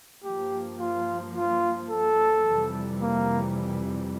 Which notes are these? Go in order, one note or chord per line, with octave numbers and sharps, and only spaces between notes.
G2 F3 A#3 G4
F4
F4
A4
F2 C3 E3 G3
A#3